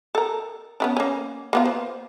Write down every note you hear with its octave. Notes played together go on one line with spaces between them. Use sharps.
A4 A#4
B3 C#4 D4
A#3 C#4
A#3 B3 F4
C5